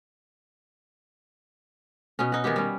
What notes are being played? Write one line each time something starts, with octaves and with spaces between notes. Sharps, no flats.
B2 B3 C#4
D#4 F#4
D#3 E3 B3 G4
G3 C#4